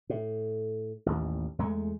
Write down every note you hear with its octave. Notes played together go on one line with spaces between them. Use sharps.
A2
A1 D#2
E2 G#3 A3